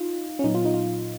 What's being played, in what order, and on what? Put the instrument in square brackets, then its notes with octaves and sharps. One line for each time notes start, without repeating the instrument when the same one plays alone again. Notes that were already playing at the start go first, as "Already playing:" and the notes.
Already playing: [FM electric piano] D#4 F4
C#4
A#2 F#3 B3 D#4
F4
D#4
F4